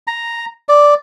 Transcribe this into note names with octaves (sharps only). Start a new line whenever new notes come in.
A#5
D5